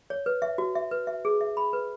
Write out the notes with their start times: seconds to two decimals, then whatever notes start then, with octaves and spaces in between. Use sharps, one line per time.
0.10 C#5
0.26 B4
0.42 E5
0.58 F#4
0.75 E5
0.91 B4
1.07 E5
1.25 G#4
1.41 E5
1.57 B5
1.73 B4